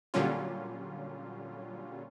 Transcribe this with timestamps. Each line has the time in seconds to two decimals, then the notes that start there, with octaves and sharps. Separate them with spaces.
0.14 A#2 D3 F#3 G3 C#4 F4